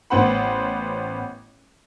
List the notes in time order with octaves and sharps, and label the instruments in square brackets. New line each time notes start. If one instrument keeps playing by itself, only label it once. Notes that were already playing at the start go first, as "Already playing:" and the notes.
[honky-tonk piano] A1 B3 C5 F#5 B5